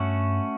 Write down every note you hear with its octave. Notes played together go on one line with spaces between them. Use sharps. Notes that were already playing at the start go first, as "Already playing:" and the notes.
Already playing: G2 A3 C#4 F#4